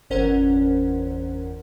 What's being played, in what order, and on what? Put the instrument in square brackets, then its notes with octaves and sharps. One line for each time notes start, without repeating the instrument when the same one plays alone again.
[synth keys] G1 E2 C#4 A#4 C5 F#5